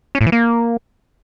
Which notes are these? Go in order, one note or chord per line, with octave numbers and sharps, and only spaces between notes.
C#4
A2
E3
A#3